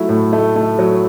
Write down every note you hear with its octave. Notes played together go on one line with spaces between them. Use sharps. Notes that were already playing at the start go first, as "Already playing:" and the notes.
Already playing: F#3 A3 E4
A2
A3
A3
F#3